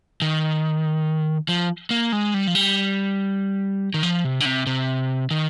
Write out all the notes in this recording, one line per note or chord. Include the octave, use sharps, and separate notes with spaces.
D#3
F3
A#3
G#3
G3
F3
G3
D#3
F3
C3
D3
C3
C3
D#3